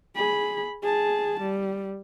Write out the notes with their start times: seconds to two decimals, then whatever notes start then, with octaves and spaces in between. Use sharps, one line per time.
0.15 G#4 B5
0.82 G#4 A5
1.41 G3